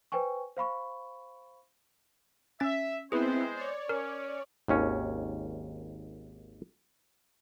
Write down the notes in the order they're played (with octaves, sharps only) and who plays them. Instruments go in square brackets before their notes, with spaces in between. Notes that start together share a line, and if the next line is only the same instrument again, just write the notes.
[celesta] B4 C5 G5 G#5 C#6
C5 F5 B5 C#6
[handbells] C#4 A6 [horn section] E5
[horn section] G#3 C5 [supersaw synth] B3 C4 E4 [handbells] G#4 B4
[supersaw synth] C#5 D5
[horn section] C#4 [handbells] A#4
[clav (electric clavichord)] G#1 D#2 C#4